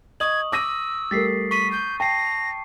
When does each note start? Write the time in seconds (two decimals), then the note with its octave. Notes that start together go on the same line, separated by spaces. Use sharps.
0.20 D#5 C#6 D#6 G#6 F#7
0.52 D6 E6 A#6 D#7
1.11 G3 A3 A#4 A6 B6 C7
1.51 C#6 B6 D#7
1.72 G6
2.00 G5 A5 A#6 C7